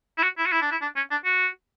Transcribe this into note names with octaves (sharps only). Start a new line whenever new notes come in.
E4
F#4
E4
F#4
E4
D4
E4
D4
C#4
D4
F#4